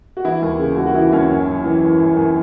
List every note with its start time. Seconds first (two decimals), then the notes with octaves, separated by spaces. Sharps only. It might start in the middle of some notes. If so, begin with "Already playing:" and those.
0.17 F#4
0.25 E3 E4
0.42 D#2
0.59 C#3
0.77 D#2 F#4
0.87 F#4
0.95 E3 E4
1.12 D#2 C#4
1.29 F#2
1.47 F#2
1.64 E3
1.82 E3
2.00 F#2
2.17 F#2